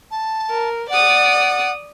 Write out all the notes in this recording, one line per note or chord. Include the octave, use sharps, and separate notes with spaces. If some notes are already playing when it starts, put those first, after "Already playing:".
A5
A#4
D5 F#5 D#6